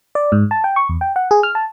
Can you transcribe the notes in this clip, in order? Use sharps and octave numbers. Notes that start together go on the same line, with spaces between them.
D5
G#2
A5
G5
C#6
E2
G5
F#5
G#4
F6
A5